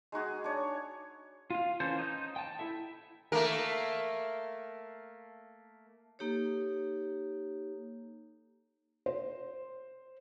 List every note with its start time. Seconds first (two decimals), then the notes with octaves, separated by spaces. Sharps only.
0.12 G#3 D#4 F#4 G#4
0.44 D4 C#5
1.50 F4 F5
1.80 E3 C#4 A4 C5 G6
1.98 D#4 G6
2.36 G5 A5
2.59 E4 A4 E5
3.32 A3 A#3 A#4
6.19 A#3 D#4 G4 A4 C#5
9.06 C5